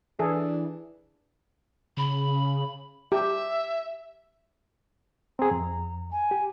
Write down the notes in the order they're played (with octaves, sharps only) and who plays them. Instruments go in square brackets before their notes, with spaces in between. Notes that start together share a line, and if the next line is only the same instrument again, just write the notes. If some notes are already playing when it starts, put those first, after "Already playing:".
[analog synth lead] E3 [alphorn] D4 [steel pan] G#4 A4
[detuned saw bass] C#3 [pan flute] B5
[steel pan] G4 [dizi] E5
[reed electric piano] C4 G#4 [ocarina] A#5
[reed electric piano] F2
[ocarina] G#5
[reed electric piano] G4